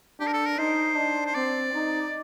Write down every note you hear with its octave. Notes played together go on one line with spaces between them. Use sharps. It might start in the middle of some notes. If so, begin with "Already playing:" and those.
D4 G4
A#4
A4
A#4
D#4 C5
D4
C5
C4 D5
D#4